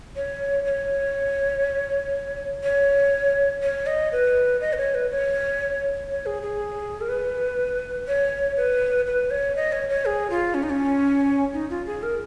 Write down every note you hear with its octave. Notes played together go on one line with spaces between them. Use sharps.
C#5
C#5
C#5
C#5
D#5
B4
D#5
B4
C#5
B4
C#5
C#5
G#4
G#4
A#4
B4
C#5
B4
B4
C#5
D#5
C#5
C#5
G#4
F4
C#4
D#4
C#4
D#4
F4
G#4
A#4